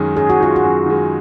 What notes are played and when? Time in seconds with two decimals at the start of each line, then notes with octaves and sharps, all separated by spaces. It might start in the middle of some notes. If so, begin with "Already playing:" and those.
Already playing: F#2 D#3 G#3
0.17 F#2 G#4
0.30 F#4
0.40 D#3 G#3 F4
0.56 F#4
0.63 F#2
0.86 D#3 G#3